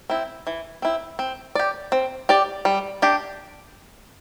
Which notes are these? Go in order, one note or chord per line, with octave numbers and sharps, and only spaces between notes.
C4 E4
E3
C4 E4
C4
G4 D5
C4
G4 D5
G3
D4 G4